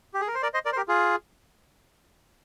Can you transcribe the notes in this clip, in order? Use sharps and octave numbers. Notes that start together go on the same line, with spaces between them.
G4
G#4
A#4
C5
A#4 D5
C5 D#5
A#4 D5
C5
G4 A#4
F4 G#4